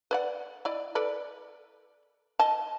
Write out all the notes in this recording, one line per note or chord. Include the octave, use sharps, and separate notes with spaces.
B4 D5 F#5
E4 D5 D#5
A4 B4 D5
D#5 A5